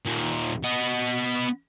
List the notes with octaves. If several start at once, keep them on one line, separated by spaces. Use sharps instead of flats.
D#2 A#2
B3 D#5